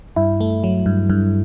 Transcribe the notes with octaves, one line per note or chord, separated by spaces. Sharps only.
G2 E4
A3
F#3
G2
G2